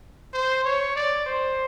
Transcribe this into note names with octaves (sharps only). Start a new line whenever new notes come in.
C5
C#5
D5
C5